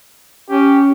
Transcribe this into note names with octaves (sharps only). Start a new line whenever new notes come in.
C#4 G4